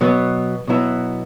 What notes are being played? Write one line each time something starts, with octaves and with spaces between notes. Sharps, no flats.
B2 F#3 B3
B2 F#3 B3 E4